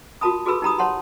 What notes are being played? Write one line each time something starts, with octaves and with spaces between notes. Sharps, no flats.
F4 F#4 A#4 A5 B5 D#6
F#4 G#4 A4 B4 B5 E6
D#4 G4 A#5 B5 D#6
C#5 F#5 A5 C6